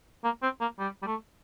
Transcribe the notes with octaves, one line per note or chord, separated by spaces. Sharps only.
A#3
C4
A#3
G3
G3
A3